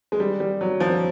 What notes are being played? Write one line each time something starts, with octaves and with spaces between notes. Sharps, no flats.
G#3
G3
G3
F#3
F3